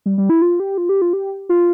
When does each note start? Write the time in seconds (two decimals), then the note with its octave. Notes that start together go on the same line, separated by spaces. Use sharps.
0.06 G3
0.18 G3
0.29 E4
0.42 F4
0.60 G4
0.78 F4
0.89 G4
1.02 F4
1.13 G4
1.49 F4